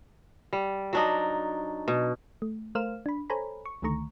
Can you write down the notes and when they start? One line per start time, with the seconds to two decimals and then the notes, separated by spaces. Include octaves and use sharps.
0.53 G3
0.93 F#3 D4 D#4
1.88 B2
2.42 A3
2.75 A3 A#4 C5 F5 F6 E7
3.06 D4 B5
3.30 A4 C5 C#5 G#5 A#5 B5
3.66 C#6
3.82 C#2 D3 D#3 A3 A#5 C#6